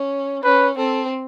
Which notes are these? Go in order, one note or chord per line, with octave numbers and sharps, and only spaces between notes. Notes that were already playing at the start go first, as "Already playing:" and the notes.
Already playing: C#4
C#4 B4
C4 A4